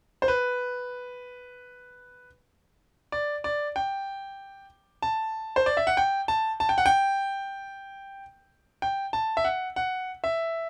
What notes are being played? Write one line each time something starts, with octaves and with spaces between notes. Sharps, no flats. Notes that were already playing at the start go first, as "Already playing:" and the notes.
C5
B4
D5
D5
G5
A5
C5
D5
E5
F#5
G5
A5
A5
G5
F#5
G5
G5
A5
E5
F#5
F#5
E5